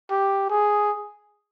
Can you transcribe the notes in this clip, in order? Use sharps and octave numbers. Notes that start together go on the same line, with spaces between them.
G4
G#4